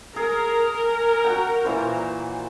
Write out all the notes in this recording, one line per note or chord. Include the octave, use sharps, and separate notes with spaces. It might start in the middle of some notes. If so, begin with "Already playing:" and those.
G#4 A#4
F#4 F#5 G5
A#2 E3 C5